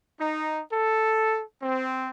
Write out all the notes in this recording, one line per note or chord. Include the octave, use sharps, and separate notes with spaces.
D#4
A4
C4